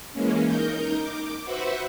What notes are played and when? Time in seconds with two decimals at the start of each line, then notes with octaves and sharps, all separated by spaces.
0.13 E3 G#3 A#3 C#4
0.44 D#4 A#4 G6
1.00 D6
1.44 F#4 B4 C5 E5 F#5